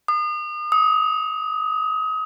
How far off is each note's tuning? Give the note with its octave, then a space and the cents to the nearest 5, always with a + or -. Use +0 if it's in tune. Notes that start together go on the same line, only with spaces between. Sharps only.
D#6 -40
D#6 +30